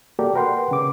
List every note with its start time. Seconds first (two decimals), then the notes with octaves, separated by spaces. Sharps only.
0.19 A#3 F#4 G4 A4 A#4 D5
0.35 A#4 B4 F#5 G5 C6
0.71 C#3 D6